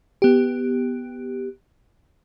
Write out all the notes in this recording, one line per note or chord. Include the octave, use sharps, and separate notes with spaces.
B3 G4